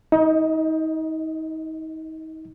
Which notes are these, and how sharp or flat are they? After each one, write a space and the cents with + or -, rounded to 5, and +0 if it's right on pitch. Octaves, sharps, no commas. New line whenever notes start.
D#4 +35 D#5 +0